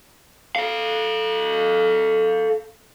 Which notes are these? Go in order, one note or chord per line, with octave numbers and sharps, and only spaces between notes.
A4 F5